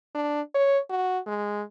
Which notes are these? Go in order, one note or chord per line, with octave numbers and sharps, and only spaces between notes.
D4
C#5
F#4
G#3